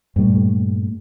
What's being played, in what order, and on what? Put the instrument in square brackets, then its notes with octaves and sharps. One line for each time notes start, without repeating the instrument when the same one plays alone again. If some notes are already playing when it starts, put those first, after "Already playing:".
[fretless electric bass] G2 A#2 G3 A3